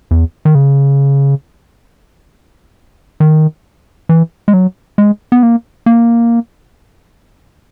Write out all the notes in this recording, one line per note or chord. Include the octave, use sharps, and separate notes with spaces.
E2
D#3
C#3
D#3
E3
G#3
F#3
G#3
B3
A#3
A#3